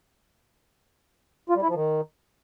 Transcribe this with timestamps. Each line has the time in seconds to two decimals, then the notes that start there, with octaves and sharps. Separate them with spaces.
1.49 F4
1.56 G3
1.62 E4
1.68 F3
1.75 D#3